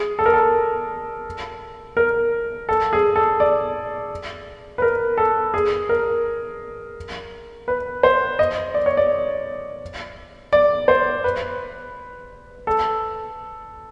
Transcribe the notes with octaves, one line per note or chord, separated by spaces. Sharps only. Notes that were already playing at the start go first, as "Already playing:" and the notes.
Already playing: G#4
A4
A#4
A4
A#4
A4
G#4
A4
D5
B4
A#4
A4
G#4
A#4
B4
C5
D#5
D5
C#5
D5
D5
C5
B4
A4